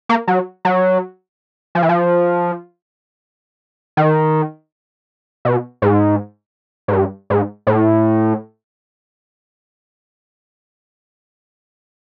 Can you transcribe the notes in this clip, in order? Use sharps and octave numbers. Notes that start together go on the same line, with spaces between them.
A#3
F#3
F#3
F3
E3
F3
D#3
B2
G#2
G#2
G2
G#2
A2